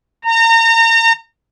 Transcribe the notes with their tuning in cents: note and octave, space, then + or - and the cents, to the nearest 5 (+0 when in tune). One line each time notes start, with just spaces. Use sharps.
A#5 -35